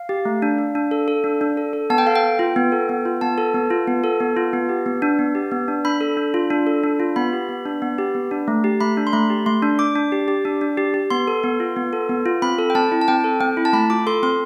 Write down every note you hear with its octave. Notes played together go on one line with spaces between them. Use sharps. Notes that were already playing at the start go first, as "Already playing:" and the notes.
Already playing: F5
G4
A3
D4
D4
D4
A4
A4
D4
D4
A4
A4
B3 A5
G5
A4 F5
G5
B3
F4
B3
A4
B3
F4
B3 A5
A4
B3
F4
B3
A4
B3
F4
B3
G4
B3
D4
B3
G4
B3
D4
D4 B5
A4
D4
F4
D4
A4
D4
F4
B3 B5
G4
B3
D4
B3
G4
B3
D4
A3
G4
A3 B5
D4
C6
A3 B5
G4
A3 C6
D4
D4 D6
D4
G4
G4
D4
D4
G4
G4
B3 C6
A4
B3
F4
B3
A4
B3
F4
C4 B5
A4
G5
C4 A5
E4
A5
C4 G5
A4
C4 G5
E4
A5
A3 B5
F4 D6
A4 C6
C4 C6